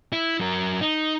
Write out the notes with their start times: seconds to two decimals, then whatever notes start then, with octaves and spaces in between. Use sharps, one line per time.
0.13 E4
0.40 F#3 A#4
0.81 D#4